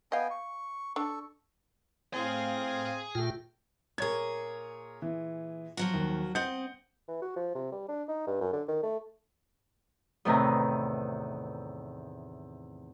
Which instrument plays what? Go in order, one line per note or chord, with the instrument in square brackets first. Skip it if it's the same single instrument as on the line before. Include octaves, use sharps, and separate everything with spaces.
[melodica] B3 G5 G#5 [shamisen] D#5 F5
[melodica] C#6
[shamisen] D4 [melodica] A4 C#6
[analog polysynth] A2 F5 [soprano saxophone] C4 [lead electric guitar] G#4 G#5
[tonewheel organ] A#2 F4 [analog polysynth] A3 G5
[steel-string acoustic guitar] A#2 G#4 [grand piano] A#4 C#5 G#6
[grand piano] E3
[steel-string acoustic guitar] F3 F#3 F#4
[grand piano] D#2
[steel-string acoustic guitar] C4 D#5 [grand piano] F#5 G6 C#7
[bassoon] E3
F#4
F3
C3
G3
D4
D#4
G2
F#2
D3
D#3
A3
[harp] E2 A2 C3 D#3 B4 A#5